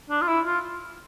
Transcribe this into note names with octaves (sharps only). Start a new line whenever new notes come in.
D4
F4
E4
F4